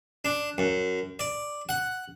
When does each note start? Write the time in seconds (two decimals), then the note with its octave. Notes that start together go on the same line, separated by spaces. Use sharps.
0.25 D4
0.58 F#2
1.19 D5
1.69 F#5